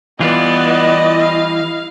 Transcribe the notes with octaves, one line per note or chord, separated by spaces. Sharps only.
E3 G3 B3 F4 D5 D#5
E4
F5